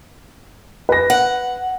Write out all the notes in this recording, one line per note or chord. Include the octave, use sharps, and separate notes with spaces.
B4 A#6
F#5